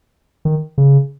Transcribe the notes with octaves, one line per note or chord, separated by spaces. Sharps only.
D#3
C#3